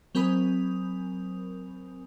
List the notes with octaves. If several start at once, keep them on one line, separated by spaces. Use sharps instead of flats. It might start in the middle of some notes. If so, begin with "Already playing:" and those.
F#3 C4 A#4 G#5 B5 D#6